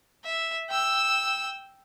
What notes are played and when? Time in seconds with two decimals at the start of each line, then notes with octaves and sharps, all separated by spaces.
0.24 E5
0.70 G5 E6